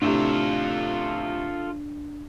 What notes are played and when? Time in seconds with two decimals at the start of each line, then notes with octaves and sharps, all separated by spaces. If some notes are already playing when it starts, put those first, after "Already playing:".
0.02 A2 C3 D4 F4 A4